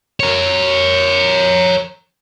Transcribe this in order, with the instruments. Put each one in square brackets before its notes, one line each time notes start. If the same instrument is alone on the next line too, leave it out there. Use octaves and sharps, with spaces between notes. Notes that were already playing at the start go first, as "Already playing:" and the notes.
[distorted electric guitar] A#4 C#5